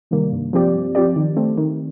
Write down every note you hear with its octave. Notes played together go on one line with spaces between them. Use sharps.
C3 D#3 G3 A#3
G2
F3 C4 G4 D5
G2
F3 C4 G4 D5
D#3
A3 C4
D#3